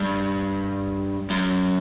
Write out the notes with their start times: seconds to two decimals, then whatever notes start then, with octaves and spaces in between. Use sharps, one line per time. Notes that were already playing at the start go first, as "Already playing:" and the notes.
Already playing: G2
1.30 F#2